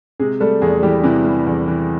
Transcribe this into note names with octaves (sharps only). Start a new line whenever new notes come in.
C3 G#3 G#4
G3 A3 A4
E2 G#3 G#4
E3 G3 G4
C3 E3 E4
G3
E2
E3